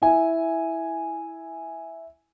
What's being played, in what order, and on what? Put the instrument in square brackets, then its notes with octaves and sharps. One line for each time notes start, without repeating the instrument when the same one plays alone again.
[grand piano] E4 G#5